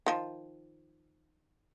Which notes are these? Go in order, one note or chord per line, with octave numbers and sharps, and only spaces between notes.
D#3 F3